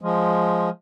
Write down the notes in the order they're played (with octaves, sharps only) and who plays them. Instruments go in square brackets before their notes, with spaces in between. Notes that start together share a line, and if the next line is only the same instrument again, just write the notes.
[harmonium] F3 G#3